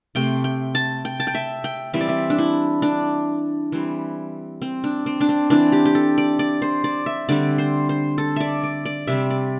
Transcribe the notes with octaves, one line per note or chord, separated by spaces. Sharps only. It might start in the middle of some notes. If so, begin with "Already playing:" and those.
C3 A3 C4 G5
G5
A5
G5
A5
G5
E5
G5
E3 G3 C4 E5
D5
E5
D4
E4
D4
E3 G3 C4
C4
D4
C4
D4
C4
E3 C4 D4
G4
G4
A4
D5
D5
C5
D5
E5
D3 G3 C4 D5
C5
C5
A4
D5 E5
D5
D5
C3 G3 C4 E5
D5